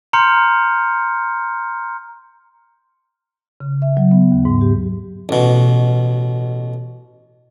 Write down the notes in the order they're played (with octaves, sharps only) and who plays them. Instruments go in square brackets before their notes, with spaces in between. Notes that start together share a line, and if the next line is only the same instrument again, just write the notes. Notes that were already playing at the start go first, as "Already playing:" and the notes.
[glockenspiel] A#5 C6 F6 G6 C#7
[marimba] C#3
E5
F#3
B3
D#2
G#2
G4
[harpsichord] A1 B2